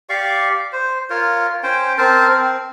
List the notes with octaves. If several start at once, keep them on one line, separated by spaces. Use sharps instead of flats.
G4 D5 F5 C#6
C5
F4 A#4 C#5
C#4 C5 G5
C4 A#4 C5 A5
C4